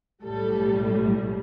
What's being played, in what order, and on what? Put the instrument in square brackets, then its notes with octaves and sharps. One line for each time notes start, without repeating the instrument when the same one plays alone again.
[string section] B1 A2 G3 A4